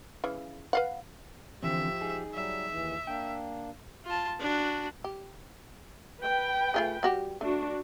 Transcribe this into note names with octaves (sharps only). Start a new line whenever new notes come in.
C#3 E3
B4 F5 F#5
D3 E3 F3 C4 G4 E5
D#4 G#4
F#3 G3 E5
D#2 E3
A#3 D4 G5
F4 A5
D4 F#4
G4
B4 G5
A3 F4 G#4
G3 F#4 G4
A3 D4 F#4